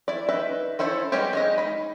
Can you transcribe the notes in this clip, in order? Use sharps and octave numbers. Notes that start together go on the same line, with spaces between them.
E4 D5
D#4 B4 E5
C#4 E4 A4 C5 C#5
G3 G#3 B3 C#4 G4
G#3 D#4 D#5
D#4 B5